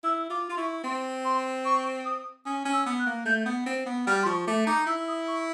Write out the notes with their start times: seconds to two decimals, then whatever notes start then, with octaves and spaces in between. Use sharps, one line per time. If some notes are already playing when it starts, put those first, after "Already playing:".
0.03 E4 E6
0.30 F4 D6
0.49 F4 C6
0.57 E4 C#6
0.84 C4 C6
1.24 C6
1.65 C#6
2.05 D#6
2.45 C#4 D#6
2.65 C#4
2.72 E6
2.86 B3
2.99 F#6
3.06 A#3
3.26 A3 G6
3.46 B3
3.66 C4
3.86 B3
4.07 G3 F6
4.23 C6
4.26 F3 C#6
4.46 A3 D6
4.67 D#4 D6
4.86 E4 E6
5.08 D#6
5.27 C#6